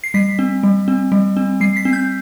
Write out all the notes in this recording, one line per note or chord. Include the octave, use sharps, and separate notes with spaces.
C7
G3 B6
C4
G3
C4
G3
C4
G3 C7
B6
C4
G6